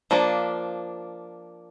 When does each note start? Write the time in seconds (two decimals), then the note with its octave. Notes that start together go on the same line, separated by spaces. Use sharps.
0.11 F3 A#3 D4